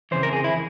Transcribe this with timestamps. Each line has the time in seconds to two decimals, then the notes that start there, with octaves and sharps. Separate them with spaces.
0.11 F2 C#3 E3 C5
0.23 A#4
0.33 G#4
0.44 E4